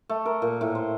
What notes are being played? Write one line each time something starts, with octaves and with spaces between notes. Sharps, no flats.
A3
A#4
A#2
A2
C5